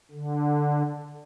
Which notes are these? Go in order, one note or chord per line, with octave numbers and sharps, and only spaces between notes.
D3